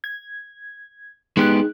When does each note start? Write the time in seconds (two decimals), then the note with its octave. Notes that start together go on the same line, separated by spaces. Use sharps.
0.04 G#6
1.37 G#3 B3 D#4 G4 G#4 F#6